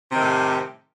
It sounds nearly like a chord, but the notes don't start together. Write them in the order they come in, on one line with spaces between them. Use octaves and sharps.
C3 D#3 A2 G3